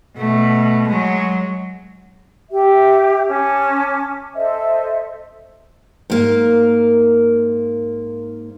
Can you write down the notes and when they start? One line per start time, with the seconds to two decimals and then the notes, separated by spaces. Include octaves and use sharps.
0.17 B2 A3
0.88 F#3 G#3
2.51 G4 E5
3.27 C#4 A5 D6
4.35 A4 C5 D#5 E5
6.10 G#2 A#3